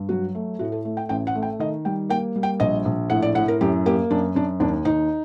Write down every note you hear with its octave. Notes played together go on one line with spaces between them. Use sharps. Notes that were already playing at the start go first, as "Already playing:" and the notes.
Already playing: G2
F#3 F#4
A3
A2 F#4
A4
A3
G5
A1 G5
F#5
A3
G5
D#3 D#5
G3 G5
A#3 G5
G3
G5
A#1 D#5
A#1
A2 F#5
D5
A2 F#5
A#4
F#2 G4
A#3 G4
F#2 D4
F#2 D4
D#2 D4
D#2 D#4